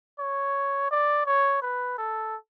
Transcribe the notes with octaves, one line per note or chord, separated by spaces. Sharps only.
C#5
D5
C#5
B4
A4